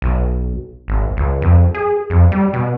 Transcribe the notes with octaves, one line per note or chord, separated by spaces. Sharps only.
B1
G#1
C#2
F2
G#4
F2
G3
B2